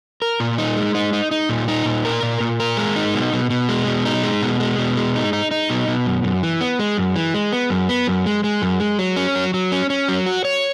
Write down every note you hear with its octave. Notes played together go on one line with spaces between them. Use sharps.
A#4
A#2
D#4
G#3
D#4
D#4
D#4
A#2
D#4
A#2
A#4
A#2
A#2
A#4
G#3
D#4
B2
B2
B2
G#3
B2
D#4
G#3
B2
G#3
B2
G#3
D#4
D#4
D#4
B2
B2
F#2
F#2
E3
B3
G#3
F#2
E3
G#3
B3
F#2
B3
F#2
G#3
G#3
F#2
G#3
F#3
C#4
F#3
F#3
C#4
C#4
F#3
F#4
C#5